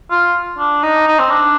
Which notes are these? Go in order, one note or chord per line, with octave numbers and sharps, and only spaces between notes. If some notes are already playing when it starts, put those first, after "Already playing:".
F4
D4
D#4
D#4
C4
D4